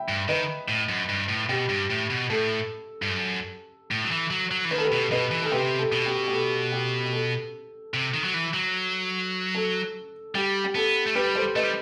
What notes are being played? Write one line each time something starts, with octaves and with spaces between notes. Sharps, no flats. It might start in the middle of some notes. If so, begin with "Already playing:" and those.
Already playing: E5 G5 B5
G2
D#3 B4 D#5
A2
F#2
G2
A2
B2 G4
G2
A2
B2
A2 A4
G2
F#2
A2
F#3
E3
F#3
F#3
E3
D#3 B4
A4
G4 B4
B2
B2 B4 D#5
E3
D#3 A4
C3 G4 B4
A4
B2
G4
G4
A4
G4
G4
A4
C3
D#3
F#3
E3
F#3
A4
G3 G4
G4
B3 A4
A3
G3 G4 B4
A4 C5
A3 B4 D#5
G3